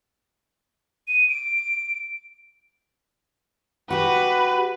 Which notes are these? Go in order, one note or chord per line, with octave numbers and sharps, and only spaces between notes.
D#7
D7
F#4 G4 B4